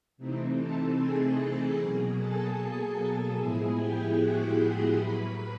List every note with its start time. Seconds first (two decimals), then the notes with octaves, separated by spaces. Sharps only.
0.17 C3 E3 A3 C4 D#4
0.58 A4 A5
0.97 G#4 G#5
1.78 B2 F#3 A#3
2.18 A4 A5
2.58 A4 A5
2.98 A4 A5
3.37 A2 F3 G#3 B3 E4 G#4 G#5
3.77 G4 G5
4.18 F#4 F#5
4.58 G4 G5
4.98 A2 F#3 A#3 B4 B5